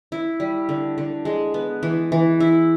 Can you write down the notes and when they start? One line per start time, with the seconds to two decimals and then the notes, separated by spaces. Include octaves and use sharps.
0.12 E4
0.40 G3
0.69 D3
0.98 D3
1.25 G#3
1.54 B3
1.83 E3
2.12 E3
2.40 E4